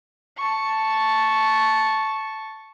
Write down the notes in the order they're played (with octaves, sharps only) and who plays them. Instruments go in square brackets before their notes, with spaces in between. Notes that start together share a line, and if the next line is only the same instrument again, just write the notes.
[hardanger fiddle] A5 C#6